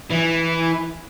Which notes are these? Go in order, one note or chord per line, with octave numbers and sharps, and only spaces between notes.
E3